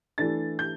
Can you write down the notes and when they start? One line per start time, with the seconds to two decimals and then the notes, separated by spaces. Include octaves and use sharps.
0.18 E3 A3 D4 A6
0.59 G6